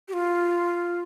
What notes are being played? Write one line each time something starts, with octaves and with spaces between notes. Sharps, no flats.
G4
F4